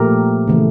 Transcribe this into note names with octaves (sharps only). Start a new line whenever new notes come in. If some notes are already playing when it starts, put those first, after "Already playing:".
Already playing: A#2 F3 A3 G4 A#4
C#3 E3 A3